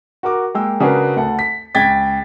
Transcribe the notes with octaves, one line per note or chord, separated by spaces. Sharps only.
F#4 A#4 D6
G#3 A#3 G5 E6
C#3 D4 F#4 G#4 A#4 B4
D2 F#5 A5
B6
C#2 G5 G#6 A6 B6